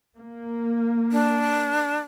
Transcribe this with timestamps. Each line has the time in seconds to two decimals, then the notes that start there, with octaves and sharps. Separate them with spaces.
0.16 A#3
1.12 D4